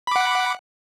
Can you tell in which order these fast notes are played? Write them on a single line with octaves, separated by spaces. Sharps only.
B5 D6 F#5